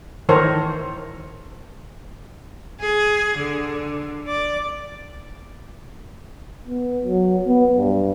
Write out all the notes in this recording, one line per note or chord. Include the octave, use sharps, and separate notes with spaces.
D#3 E3 A4 A#4 C5 C#5
G#4
D3
D5
B3
F#3
B3
G2